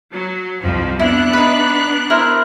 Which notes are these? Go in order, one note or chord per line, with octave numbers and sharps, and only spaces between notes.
F#3
C2 F2 F3
B3 D4 E4 F#6
D#4 B4
E4 A#4 C5